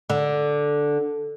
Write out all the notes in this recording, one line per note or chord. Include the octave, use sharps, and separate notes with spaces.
D3